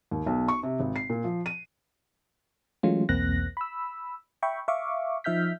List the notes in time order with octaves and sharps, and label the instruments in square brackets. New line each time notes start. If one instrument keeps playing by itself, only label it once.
[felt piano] D#2
B1
C#6
C3
G#1
C7
A#2
F3
D#7
[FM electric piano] E3 F#3 G#3 A3 C#4 F4
B1 E2 A#3 C4 F#6 A#6
B5 E6
E5 G5 B5 C#6
E5 F5 C#6 D6
F3 D#4 E5 F6 G6 B6